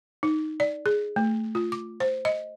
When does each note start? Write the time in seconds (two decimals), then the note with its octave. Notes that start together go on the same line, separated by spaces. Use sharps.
0.23 D#4
0.60 D5
0.86 G#4
1.16 A3
1.55 F4
1.72 D6
2.00 C5
2.25 D#5